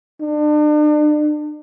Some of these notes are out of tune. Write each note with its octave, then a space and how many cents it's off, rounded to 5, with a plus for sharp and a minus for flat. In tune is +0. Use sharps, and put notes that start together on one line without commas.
D4 +40